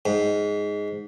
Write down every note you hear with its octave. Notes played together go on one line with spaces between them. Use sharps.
G#2